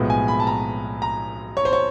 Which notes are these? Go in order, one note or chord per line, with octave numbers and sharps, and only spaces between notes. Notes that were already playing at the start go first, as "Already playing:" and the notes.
Already playing: B1 A2 F3 G#3 B3
G#5
B5
A5
A#5
A#5
C#5
C5
C#5